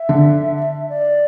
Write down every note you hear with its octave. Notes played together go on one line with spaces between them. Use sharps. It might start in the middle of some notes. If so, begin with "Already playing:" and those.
Already playing: E5
D3
D5